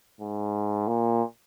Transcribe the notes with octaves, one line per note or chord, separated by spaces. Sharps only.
G#2
A#2